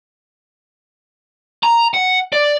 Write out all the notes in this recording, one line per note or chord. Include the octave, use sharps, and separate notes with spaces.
A#5
F#5
D5